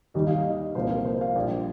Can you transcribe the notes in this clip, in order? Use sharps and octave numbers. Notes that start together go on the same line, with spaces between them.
D#2 D#3 G3 D#5
F5
D#5
C2 A#2 F3 A#3 C5
A#4
C5
F5
A#1 A#2 G3